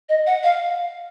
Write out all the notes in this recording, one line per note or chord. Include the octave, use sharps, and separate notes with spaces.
D#5
F#5
F5